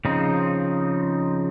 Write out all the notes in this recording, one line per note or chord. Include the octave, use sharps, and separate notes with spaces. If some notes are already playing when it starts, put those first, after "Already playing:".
C#3 F3 C4 D#4